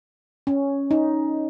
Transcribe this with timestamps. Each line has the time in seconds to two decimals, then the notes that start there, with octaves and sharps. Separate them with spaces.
0.47 C#4
0.91 D#4